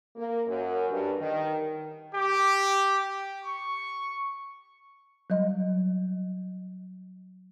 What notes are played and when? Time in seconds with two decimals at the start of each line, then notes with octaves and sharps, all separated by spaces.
0.16 A#3
0.47 F#2
0.89 G2
1.20 D#3
2.15 G4
3.44 C#6
5.30 F#3 G3 D#5